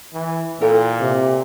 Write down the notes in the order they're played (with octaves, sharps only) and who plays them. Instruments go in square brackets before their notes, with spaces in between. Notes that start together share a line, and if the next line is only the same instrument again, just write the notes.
[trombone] E3
[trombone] A#2 [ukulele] E4 A4 G5
[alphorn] C3